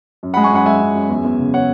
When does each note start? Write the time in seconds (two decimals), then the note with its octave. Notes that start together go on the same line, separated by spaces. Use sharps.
0.23 F#2
0.34 G#3 F#5 B5
0.44 G#5 C#6
0.52 F#2 F#5 B5
0.66 G#3 E5 G#5
0.80 F#2
0.95 F#2
1.09 E2
1.24 E2
1.39 C#3
1.54 C#5 F#5